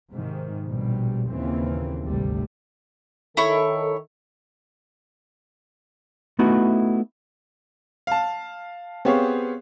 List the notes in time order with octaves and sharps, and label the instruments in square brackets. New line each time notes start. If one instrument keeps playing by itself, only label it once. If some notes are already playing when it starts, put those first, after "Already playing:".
[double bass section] G#2 C3 D#3
A#1 B2 G3
D#2 A#2 C#3 E3 C4
G#1 D2 C3 G3 A3
[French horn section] D#3 A4 [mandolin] E4 C#5 C#6
[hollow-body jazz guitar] A3 B3 D#4 E4 F#4
[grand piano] F5 A5
B3 C4 G4 G#4 C#5 F5